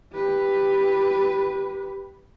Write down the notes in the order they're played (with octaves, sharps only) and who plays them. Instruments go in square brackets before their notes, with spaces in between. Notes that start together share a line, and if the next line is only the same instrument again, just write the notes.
[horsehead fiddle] G4 B4